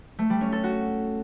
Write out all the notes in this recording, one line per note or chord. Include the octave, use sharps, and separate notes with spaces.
A3
G3
C#4
A4
F#4